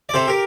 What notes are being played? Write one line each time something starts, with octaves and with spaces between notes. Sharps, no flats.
D5
C3 A4 C5
G4 A#4